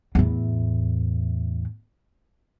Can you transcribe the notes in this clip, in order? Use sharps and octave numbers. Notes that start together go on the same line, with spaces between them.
E2 A2